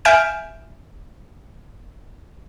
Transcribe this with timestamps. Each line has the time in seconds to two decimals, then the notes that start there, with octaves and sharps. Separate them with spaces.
0.05 E5 G#5 F6 G6 D7